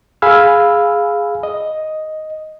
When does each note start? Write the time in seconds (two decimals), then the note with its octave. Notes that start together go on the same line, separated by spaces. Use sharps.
0.22 G#4 F5 G#5 B5 E6 F6
1.43 D#5